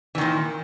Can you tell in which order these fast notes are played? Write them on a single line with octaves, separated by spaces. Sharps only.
E3 D#3 A#2